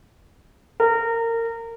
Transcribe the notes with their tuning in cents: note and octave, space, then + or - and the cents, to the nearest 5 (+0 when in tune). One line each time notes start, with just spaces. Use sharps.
A#4 -25